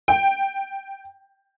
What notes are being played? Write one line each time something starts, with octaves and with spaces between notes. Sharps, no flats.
G5